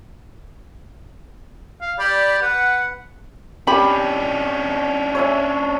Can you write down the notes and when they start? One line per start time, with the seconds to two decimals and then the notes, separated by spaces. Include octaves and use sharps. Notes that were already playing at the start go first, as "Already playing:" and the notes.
1.81 F5
1.99 G4 D5 B5
2.42 B4 F#5
3.67 C#4 D4 G4 B5
5.15 C#5 E5 G#5